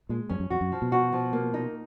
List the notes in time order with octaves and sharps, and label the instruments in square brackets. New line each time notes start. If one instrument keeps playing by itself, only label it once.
[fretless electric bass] A#2 [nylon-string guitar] G#3
[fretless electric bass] F#2 [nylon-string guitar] C#4
[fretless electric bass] F#2
[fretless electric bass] F2 [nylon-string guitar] F#4
[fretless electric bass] F#2
[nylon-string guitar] F3
[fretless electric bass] B2
[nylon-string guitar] F#4
F3
A#3
D#4